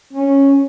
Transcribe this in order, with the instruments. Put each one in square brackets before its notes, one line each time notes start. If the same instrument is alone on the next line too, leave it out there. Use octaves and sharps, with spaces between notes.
[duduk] C#4